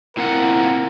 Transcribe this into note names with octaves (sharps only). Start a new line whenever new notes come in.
A#2 C4 E4 A#4 F#5